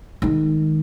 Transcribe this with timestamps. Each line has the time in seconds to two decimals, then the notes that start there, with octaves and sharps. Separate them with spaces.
0.22 D#3 G#3